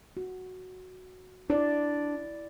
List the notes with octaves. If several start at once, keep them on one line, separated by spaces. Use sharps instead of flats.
F#4
D4 E4 D5